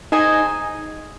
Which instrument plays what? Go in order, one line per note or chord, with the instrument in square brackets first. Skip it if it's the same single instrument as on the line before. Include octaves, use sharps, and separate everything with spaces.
[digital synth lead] D#4 [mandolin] G#4 C5 D#5 G#5